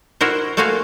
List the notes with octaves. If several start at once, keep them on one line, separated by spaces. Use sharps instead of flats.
E4 F#4 A#4 C5
A3 A#3 F#4 C5 F5 G#5